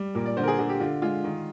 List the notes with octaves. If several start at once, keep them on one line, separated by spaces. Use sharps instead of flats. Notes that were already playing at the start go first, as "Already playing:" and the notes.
Already playing: G3
A#2 A#4
D5
D3 C5
A#4
G#4
D3 G#4
G4
D3 F4
G#3 F4
D#3